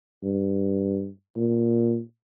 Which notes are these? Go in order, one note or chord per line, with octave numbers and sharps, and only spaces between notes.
G2
A#2